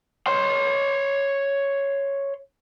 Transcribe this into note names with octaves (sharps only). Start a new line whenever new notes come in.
C#5 C6